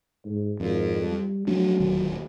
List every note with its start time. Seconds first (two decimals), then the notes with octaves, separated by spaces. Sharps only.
0.25 G#2
0.60 G#1 F2
1.04 G3
1.47 F3 F#3 A3 D4
1.80 D#1 D2 D#3